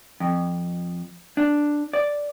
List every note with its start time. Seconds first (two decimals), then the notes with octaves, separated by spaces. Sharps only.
0.20 F2
1.37 D4
1.93 D5